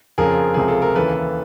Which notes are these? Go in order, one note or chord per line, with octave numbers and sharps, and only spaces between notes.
F2 C#3 F3 G#4 A#4
C#2 C3 F3 G#4
A4
A#4
D#2 C#3 E3 A4 B4